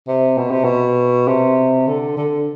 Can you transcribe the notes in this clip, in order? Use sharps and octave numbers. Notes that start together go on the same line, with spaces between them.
C3
B2
C3
B2
C3
D3
D3